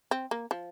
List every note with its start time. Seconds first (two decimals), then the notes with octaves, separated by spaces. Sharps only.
0.11 C4
0.31 A#3
0.51 F3